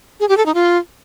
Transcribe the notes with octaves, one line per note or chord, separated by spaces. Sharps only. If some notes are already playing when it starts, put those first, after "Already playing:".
G#4
G4
A4
D#4
F4